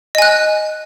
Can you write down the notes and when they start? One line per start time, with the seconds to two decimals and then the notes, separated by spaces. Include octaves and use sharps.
0.15 D#5
0.18 G#5
0.22 F#6